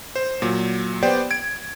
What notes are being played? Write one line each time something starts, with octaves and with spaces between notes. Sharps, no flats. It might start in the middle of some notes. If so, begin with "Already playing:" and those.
C5
A#2 F#3
B3 G4 C5 D5 G5
G#6 D7